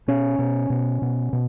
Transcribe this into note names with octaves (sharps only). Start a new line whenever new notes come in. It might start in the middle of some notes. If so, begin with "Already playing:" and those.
B2 C#4
B2
B2
B2
B2